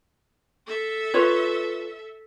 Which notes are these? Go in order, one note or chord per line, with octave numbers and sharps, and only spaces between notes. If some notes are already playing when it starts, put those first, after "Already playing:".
A4 E5
F4 B4 C#5